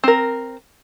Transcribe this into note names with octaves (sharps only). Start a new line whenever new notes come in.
C4 A#4